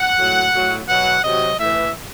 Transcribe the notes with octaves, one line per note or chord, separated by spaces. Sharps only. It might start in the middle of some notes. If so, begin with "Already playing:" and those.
Already playing: F#5
A2 F#3
A2 F#3
B2 F#3 F#5
C3 F#3 D#5
A2 E3 E5